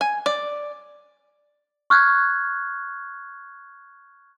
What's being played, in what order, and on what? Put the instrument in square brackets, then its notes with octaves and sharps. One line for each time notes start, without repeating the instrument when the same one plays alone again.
[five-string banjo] G#5
D5
[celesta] C#6 F6 F#6 G#6